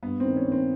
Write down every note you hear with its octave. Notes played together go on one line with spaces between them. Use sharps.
G2 B3
D#3 C4
C#4
D#3 C4